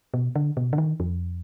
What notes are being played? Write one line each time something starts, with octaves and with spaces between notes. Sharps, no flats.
B2
D3
B2
D3
D#3
F2